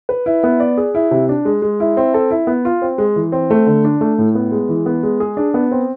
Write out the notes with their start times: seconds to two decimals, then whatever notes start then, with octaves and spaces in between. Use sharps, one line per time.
0.09 B4
0.26 E4
0.44 B3
0.60 D5
0.78 G#4
0.95 E4
1.11 C3
1.29 D4
1.45 G#3
1.62 G#3
1.80 E4
1.97 C4
2.14 A4
2.31 E4
2.47 B3
2.65 F4
2.82 C4
2.98 G#3
3.16 E3
3.32 C4
3.50 A3
3.67 D3
3.85 D4
4.01 A3
4.18 A2
4.35 B3
4.51 G#3
4.69 E3
4.86 B3
5.03 G#3
5.20 G#4
5.37 D4
5.54 B3
5.71 C4